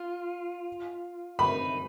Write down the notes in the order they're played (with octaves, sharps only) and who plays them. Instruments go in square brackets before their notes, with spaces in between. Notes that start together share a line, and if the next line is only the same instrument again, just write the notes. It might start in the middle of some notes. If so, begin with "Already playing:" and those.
Already playing: [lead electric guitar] F4
[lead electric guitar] D#4 [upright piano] B5